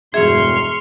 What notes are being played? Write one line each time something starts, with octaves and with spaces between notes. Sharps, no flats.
E1 G2 F#3 G#4 E5 C6 C#6 F6